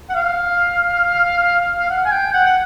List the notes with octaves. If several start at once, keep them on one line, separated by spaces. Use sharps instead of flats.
F#5
F5
F5
F#5
G#5
G5
F#5
F#5